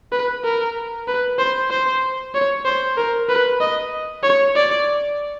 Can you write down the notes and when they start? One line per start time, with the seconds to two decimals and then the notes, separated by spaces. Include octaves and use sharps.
0.12 B4
0.44 A#4
1.08 B4
1.39 C5
1.70 C5
2.34 C#5
2.65 C5
2.97 A#4
3.29 B4
3.61 D#5
4.23 C#5
4.56 D5